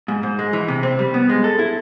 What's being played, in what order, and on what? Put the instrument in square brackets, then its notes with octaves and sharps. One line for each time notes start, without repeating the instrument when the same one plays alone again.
[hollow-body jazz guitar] G#2
G#2
G#3
E3
C3
C4
G3
B3
G#3
A4
E4